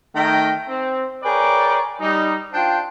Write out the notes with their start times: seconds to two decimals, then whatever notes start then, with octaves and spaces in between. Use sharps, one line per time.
0.15 D#3 A3 A#4 G5
0.69 C4
1.23 G#4 A#4 B4 C#5 D5 G5
2.01 G3 D#4
2.53 D4 F4 C5 G5